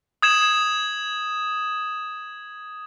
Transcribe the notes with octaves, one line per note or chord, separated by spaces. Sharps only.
D#6 G#6 E7 F#7